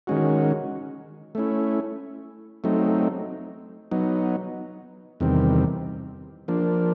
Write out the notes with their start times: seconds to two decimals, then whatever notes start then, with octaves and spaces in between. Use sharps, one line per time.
0.07 D#3 G#3 C#4 F#4
1.35 A3 C#4 E4
2.64 F#3 A3 C4 D#4
3.91 F#3 B3 D#4
5.20 E2 C3 D#3 G3 C4
6.48 F3 A#3 D4